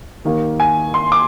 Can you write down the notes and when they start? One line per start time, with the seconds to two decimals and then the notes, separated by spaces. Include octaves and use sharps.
0.25 D#2 D#3 A#3
0.60 G#5
0.94 C6
1.12 D6